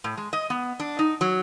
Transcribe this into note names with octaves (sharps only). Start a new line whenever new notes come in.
A2
G#3
D#5
B3
D4
D#4
F#3